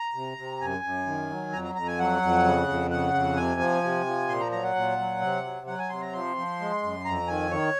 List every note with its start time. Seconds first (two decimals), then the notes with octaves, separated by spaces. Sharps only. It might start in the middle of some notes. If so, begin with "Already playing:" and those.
Already playing: A#5
0.14 C3
0.38 C3
0.61 F#2 G#5
0.84 F#2
1.06 D#3
1.30 F#3
1.53 F2 A#5
1.64 A#5
1.75 F2 A#5
1.87 G#5
1.99 F#3 F#5
2.22 F2
2.44 C#3
2.68 F2
2.91 C#3 F#5
3.14 F2
3.37 C3 G#5
3.60 F3
3.84 C3
4.06 F3
4.28 A#2 C6
4.40 A#5
4.52 F#3 A#5
4.63 F#5
4.75 A#2
4.98 F#3
5.22 C3
5.44 F#3
5.67 F#3 F#5
5.79 G#5
5.90 C3 C6
6.02 A#5
6.13 F3 C6
6.37 F3
6.60 G#3
6.83 F#2
7.05 F2 A#5
7.28 D#3 G#5
7.51 D#3 C#5